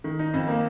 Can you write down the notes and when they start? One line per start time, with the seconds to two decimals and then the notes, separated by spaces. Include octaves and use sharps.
0.04 D#3
0.19 D#4
0.33 F2
0.48 A#3